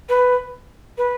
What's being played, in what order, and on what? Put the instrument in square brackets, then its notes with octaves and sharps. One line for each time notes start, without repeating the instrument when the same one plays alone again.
[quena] B4
B4